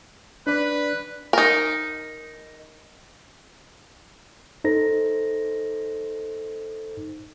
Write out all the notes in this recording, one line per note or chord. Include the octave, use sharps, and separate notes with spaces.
D4 B4 D5
D#4 A#4
D#4 A4 C5 A#6